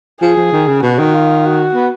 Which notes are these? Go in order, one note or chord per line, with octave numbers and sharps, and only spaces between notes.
F3 G#4
F3
D#3
C#3
B2 F#4
D#3
F4
F#4
B3